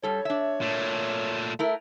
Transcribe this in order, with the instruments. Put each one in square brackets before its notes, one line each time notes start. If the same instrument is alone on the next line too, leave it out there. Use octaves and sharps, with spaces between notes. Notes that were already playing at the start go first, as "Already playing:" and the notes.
[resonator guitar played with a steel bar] G2 G3 A4 [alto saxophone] C#5
[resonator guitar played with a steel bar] D4 E5
[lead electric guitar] A#2 A3
[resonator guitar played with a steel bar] A3 E4 A#4